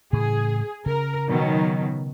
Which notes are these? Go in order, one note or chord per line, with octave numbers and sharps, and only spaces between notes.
A2 C#3 E3 G#4
C#3 A#4
B2 D#3 F#3